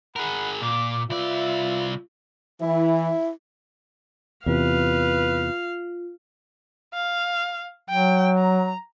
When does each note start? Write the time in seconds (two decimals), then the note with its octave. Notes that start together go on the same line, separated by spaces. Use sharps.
0.16 D#4 G#4 A#4 F#5 B5
0.62 A#2 D6
1.10 C2 F4 B4 D5 E5
2.61 E3 E4
4.46 E2 C3 F4 B4 F5
6.94 F5
7.90 F#3 G5
8.38 A#5